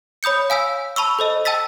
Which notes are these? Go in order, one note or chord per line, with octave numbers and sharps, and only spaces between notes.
C#5 B5 D#6 G6 C#7
F5 G#5 E6 B6
A5 B5 C#6 E6
A4 C5 D#5
G5 A5 E6 A6 B6